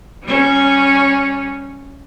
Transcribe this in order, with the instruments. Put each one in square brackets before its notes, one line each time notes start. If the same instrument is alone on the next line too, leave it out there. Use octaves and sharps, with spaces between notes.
[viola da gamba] G3 C#4